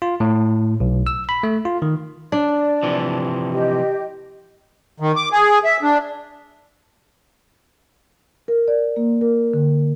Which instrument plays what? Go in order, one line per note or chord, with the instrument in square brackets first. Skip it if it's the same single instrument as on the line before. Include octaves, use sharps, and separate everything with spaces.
[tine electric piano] F4
A2
B1
E6
B5
A3
F4
D#3
[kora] D4 [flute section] D5
[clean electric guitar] C3 E3 F3
[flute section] G4 D#5
[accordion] D#3
D6
G#4
E5
D4
[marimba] A#4
D5
A#3
A#4
D3